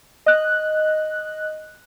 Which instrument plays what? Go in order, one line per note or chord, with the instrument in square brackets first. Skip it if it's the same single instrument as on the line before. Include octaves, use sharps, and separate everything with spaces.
[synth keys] D#5 F#6